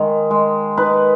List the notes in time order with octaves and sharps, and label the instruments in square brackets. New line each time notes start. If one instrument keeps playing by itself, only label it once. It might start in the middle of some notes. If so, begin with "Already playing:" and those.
Already playing: [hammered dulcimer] D#3 G#3
G#3
D#4 B4